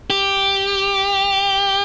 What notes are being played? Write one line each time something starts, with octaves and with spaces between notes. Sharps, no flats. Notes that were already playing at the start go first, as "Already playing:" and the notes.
G4